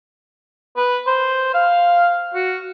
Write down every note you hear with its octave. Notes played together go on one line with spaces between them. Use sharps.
B4
C5
F5
F#4